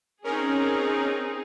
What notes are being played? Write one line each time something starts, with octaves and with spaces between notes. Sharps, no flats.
C4 C#4 D#4 G#4 A#4